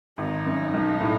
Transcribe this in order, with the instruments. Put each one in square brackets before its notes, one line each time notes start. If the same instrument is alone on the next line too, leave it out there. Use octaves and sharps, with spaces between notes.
[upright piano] G#1 [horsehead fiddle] D#4
[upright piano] F#2
B1
A2